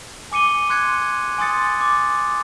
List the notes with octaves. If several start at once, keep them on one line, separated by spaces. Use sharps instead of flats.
G#5 D6 C#7 D#7 G7
C6 F#6 G#6 C#7
G#5 C6 D#6 A6 C#7
D6